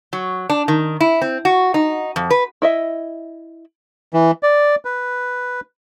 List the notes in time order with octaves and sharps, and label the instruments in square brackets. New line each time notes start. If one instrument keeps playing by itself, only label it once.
[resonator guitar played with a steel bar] F#3
D4
D#3
E4
C4
F#4
D#4
F2
B4
[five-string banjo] E4 D#5 E5
[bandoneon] E3
D5
B4